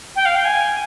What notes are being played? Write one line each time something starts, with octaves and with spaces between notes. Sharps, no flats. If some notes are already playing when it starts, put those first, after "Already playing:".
G5
F5
G5
G#5